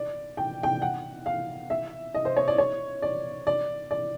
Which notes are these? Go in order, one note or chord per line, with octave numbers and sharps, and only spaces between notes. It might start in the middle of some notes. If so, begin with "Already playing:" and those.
Already playing: D5
G5
G5
F#5
F5
E5
D#5
C5
C#5
D5
C#5
D5
D5
D5